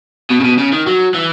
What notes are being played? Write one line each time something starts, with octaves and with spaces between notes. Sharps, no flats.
B2
C#3
B2
C#3
D#3
F#3
E3